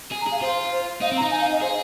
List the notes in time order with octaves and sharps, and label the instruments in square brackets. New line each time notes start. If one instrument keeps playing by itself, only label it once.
[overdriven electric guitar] G#4
[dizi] A#5
[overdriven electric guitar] G#4
[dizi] F5
[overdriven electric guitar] F4 [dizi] C5
[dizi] C5
[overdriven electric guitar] D#4 [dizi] F5
[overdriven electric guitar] C4
[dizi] A#5
[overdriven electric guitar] D#4
[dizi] G#5
F5
D#5
[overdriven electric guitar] G#4 [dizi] C5